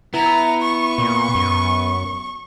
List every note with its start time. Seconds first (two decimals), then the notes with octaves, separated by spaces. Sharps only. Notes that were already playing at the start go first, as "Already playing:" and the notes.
0.14 B3 E4 A#5
0.62 C#6
0.98 A#2
1.35 F#2